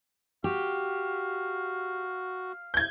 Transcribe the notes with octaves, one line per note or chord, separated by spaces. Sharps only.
F#4 G4 F5
G6 G#6